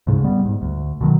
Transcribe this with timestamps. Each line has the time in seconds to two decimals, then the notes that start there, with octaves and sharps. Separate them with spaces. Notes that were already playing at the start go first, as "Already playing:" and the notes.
0.07 D2 G#2 C#3
0.24 G3 B3
0.45 G#2
0.62 D2
1.01 B2 D#3 F#3